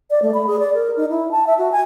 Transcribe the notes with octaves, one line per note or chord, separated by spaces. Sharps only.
D5
A3
B5
G#4
D5
A#4
D#4
E4
A5
E5
F#4
G#5